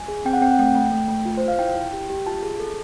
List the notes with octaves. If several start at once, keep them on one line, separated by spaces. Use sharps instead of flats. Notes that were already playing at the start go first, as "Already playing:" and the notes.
Already playing: G#5
G#4
C4 G5
F#5
C4 G5
F#5
A3 G5
A3
A3
A3
F4
F4 C5
F5
E4 G5
E4
G4
G4
F4 A5
G#4
A4